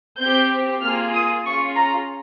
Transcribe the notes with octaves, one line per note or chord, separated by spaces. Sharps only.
C4 G4 G6
A#3 F4 G#4 F6
D#6
C#4 F4 G#4 C#6
A#5